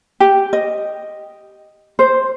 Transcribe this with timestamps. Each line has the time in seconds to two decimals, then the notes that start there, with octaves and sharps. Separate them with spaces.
0.20 G4
0.53 D#5
1.99 C5